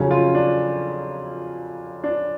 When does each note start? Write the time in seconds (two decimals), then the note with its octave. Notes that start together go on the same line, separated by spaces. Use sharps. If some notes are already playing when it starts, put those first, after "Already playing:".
Already playing: F2 C#3 F#3 C#4
0.11 F4
0.35 D4
2.04 D4